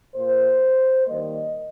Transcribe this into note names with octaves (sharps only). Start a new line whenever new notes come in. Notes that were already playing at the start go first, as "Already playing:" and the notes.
A#2 A#3 C5
D#3 G3 A#3 D#5